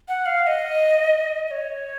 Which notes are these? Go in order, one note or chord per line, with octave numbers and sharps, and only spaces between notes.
F#5
F5
F5
D#5
D#5
C#5